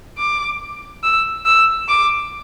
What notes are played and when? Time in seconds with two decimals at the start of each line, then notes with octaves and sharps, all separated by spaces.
0.18 D6
1.04 E6
1.46 E6
1.88 D6